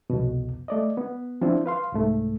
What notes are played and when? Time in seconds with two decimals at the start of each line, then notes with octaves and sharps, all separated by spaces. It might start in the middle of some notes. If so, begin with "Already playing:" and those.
0.10 C2 F2 B2
0.68 A3 D5 D#5
0.97 B3
1.41 F3 C4 D4 E4 F4 C5
1.66 B4 F5 C6
1.93 C2 G#2 A3